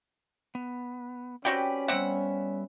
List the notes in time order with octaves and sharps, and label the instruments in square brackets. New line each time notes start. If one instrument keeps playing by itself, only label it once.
[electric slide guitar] B3
[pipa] C4 F#4 G5 [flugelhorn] C#4 [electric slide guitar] G4 B4 D5
[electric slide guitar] G3 B3 E5 [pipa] C4 F#5